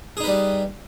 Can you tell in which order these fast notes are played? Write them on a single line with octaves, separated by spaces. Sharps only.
G#4 D#4 B4 G3